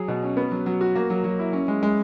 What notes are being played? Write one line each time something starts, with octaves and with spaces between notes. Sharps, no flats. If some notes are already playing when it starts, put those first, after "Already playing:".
Already playing: F#3 G#4
B2
C#4
B3
F#3
F#3
F#4
A#3
F#3
F#3
E4
C#4
G#3
G#3